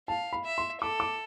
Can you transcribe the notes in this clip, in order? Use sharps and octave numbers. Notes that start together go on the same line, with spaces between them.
F5 A5
B5
E5
C6
A4 D6
D6